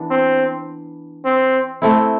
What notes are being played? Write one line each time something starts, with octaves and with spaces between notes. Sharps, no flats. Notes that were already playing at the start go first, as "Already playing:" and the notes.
Already playing: E3 B3 D4
C4
C4
A3 C4 E4